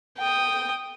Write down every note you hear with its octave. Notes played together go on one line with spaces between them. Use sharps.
G5 D#6